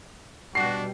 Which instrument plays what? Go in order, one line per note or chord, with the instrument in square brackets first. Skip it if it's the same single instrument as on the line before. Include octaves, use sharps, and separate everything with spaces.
[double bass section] B2 G3 [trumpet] D4 [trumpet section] F#4 [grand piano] C7